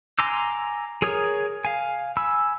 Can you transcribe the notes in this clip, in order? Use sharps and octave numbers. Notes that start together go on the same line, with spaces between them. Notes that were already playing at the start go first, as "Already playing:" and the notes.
G#5 A#5 C6 D6 E6
G#4 A#4 C#5 D#6
F5 G#5
G#5 B5 E6